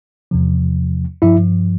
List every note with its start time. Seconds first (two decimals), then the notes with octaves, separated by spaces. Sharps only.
0.31 E2 C3 F3
1.22 G2 F3 E4 E5